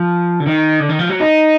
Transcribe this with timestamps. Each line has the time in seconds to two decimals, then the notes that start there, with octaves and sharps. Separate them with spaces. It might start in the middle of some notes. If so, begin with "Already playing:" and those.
Already playing: F3
0.40 D3
0.46 D#3
0.80 D3
0.89 D#3
0.99 F3
1.10 F#3
1.20 D#4